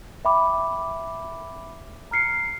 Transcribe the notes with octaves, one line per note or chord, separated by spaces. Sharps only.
E5 G5 B5 D6
A#5 F6 C7 C#7